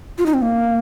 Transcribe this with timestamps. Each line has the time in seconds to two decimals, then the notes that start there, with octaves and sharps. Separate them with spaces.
0.18 F4
0.26 D#4
0.34 C4
0.42 A#3